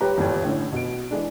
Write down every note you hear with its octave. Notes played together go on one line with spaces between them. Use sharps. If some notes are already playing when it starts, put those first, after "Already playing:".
D#1 G4 B4 C#5 A#5
G1 E2 A#2 G3 G5 G#6
A2 D3 C#4
B2 D7
E3 G#3 D4